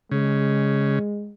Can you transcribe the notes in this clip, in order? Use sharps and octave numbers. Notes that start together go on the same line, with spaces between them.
C#3 G#3